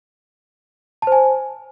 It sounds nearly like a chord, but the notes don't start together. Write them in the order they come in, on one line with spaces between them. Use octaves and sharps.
A5 C5 G#5